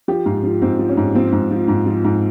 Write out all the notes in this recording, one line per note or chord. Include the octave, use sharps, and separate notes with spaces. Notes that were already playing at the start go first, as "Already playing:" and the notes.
F3 G4
G#2 F4
F3
G#2 C4
F3
C#4
G#2
F3 C4
G#2
F3
G#2
F3
G#2